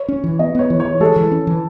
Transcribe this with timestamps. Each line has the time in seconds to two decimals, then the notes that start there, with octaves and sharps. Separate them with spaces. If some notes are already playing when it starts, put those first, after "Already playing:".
Already playing: C#5
0.08 C#4
0.24 E3
0.39 B3 D#5
0.55 B3 C#5
0.70 E3
0.80 C#5
0.85 E3
1.00 G#3 A4
1.16 E3
1.31 C#4
1.47 E3